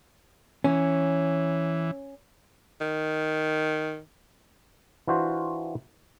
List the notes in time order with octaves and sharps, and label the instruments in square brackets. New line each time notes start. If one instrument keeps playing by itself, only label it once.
[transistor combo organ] E3 [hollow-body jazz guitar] C#4
[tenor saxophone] D#3
[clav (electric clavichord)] E3 D4 F4 F#4 C5